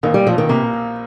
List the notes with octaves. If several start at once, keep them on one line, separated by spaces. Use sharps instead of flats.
A#1 D#3
G3
A#2 F3
D#3
C3 A#3